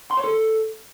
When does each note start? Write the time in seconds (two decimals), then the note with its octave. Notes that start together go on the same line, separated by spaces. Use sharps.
0.11 C6
0.17 C#5
0.24 A4